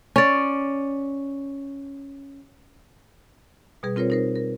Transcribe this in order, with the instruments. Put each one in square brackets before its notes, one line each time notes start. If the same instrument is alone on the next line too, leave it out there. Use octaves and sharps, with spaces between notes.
[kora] C#4 D5
[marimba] B2 G3 G#4 B4
C4 F4 A#4 C5 C#5
D#4 A#4 C5
A#4